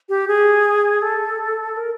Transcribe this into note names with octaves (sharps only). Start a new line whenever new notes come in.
G4
G#4
A4
A#4